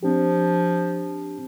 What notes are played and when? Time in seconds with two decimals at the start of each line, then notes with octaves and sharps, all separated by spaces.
0.03 F3 C4 D4 G4